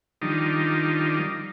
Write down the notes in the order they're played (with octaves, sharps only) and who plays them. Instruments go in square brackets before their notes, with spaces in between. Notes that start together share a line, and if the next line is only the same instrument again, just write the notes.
[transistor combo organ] D#3 F3 G3 D4 D#4